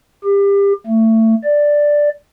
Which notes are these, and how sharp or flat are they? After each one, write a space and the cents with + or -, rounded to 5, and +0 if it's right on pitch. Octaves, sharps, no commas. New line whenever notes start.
G4 +30
A3 +25
D5 +0